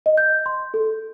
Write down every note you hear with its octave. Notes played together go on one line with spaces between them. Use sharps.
D#5
G6
C6
A4